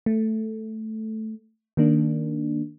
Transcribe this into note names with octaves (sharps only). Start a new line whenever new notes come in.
A3
D#3 A#3 D4